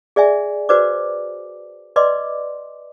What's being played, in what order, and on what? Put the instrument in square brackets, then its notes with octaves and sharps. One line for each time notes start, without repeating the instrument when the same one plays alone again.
[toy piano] G#4 D5 E5 G#5
F#4 B4 C5 D5 D6
B4 D5 D#5 C6 D6